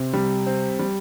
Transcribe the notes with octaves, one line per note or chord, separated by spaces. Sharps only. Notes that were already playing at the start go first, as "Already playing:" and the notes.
Already playing: C3 C4
G3
C4
G3